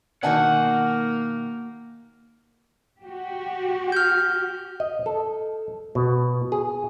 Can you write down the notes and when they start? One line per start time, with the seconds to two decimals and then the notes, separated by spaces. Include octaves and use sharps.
0.23 B2 D#3 A#3 F#4 D5 F#5 G#5 A5
3.03 F#4 G4
3.92 F6 G6
4.80 D#5
5.06 A4
5.95 B2
6.52 G#4